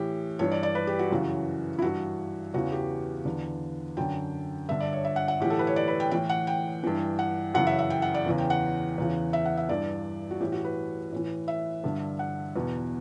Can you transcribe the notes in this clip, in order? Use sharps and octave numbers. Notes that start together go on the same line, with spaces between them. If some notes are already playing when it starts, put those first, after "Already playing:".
Already playing: A2 E3 G4
G2 E3 C#5
D5
D5
B4
G4
F#4
F#2 C#3 E3
E4
G2 E3 F#4
E2 C#3 E3 F#4
G4
E2 D3
F#2 D3 G5
G2 D3 E5
D5
C#5
E5
F#5
F#5
A2 E3 G4
A4
B4
C#5
D5
B4
G5
A2 E3 G5
F#5
G5
G2 E3
F#5
F#2 C#3 E3 F#5
E5
E5
G5
F#5
D5
E2 C#3 E3
G5
F#5
E2 C#3 E3
E5
F#5
E5
G2 E3 D5
F#4
A2 E3 G4
F#4
B4
A2 E3
E5
G2 D3
F#5
E2 B2